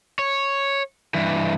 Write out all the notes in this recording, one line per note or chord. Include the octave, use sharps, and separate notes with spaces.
C#5
G2 E3